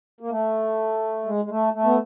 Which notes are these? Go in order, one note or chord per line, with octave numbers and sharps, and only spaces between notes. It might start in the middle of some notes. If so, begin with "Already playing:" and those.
A#3
A3
G#3
G#3
A3
A3
B3